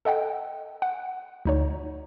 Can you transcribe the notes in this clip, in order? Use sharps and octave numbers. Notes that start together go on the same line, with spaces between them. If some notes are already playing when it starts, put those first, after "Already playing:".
A4 D#5 F#5 G5
F#5
D2 D#4 C#5